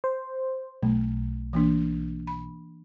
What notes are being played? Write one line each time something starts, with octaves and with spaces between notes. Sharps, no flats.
C5
B1 A3
E3 A#3 D4
B5